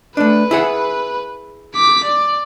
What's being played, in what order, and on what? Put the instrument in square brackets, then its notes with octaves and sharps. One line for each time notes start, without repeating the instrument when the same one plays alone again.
[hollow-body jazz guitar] A3 D4 [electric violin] B4
[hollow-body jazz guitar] E4 G#4 F#5
[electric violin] D6 B6
D5